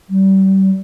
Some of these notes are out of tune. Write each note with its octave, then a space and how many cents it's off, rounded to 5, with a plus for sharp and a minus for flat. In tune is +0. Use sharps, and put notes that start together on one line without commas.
G3 -30